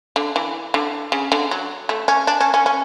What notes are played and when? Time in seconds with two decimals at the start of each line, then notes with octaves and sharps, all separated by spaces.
0.16 D3
0.36 E3
0.74 D3
1.12 C#3
1.32 D3
1.51 F#3
1.89 A3
2.08 C#4
2.27 D4
2.41 C#4
2.54 C#4
2.66 C#4